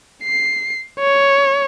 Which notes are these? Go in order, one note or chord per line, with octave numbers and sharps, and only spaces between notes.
C7
C#5